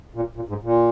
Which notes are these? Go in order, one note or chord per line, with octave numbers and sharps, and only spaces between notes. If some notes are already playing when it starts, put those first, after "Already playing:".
A#2
A#2
G#2
A#2